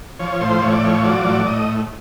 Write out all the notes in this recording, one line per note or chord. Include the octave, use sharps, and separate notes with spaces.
F3 C#5
A2 C5
A2 C#5
D5
F3 C#5
F#3 D5
A2
A2 D#5